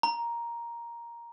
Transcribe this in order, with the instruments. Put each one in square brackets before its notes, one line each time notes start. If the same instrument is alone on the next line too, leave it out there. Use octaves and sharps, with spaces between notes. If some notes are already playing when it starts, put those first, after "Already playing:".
[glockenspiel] A#5